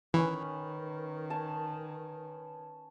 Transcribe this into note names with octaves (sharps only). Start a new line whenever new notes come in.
D#3 E3 C#4 B4
G#5 A5